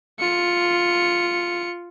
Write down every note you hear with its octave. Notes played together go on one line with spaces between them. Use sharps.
F4 C#7